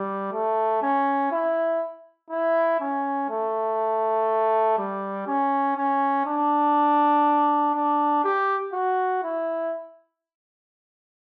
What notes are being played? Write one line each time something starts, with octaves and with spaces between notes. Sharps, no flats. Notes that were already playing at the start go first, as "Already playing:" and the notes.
Already playing: G3
A3
C#4
E4
E4
C#4
A3
G3
C#4
C#4
D4
D4
G4
F#4
E4